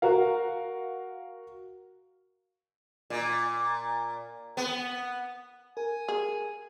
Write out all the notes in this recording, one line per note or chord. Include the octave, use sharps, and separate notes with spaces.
F#4 A#4 F5
A#2
B3
A#4 G#5
G#4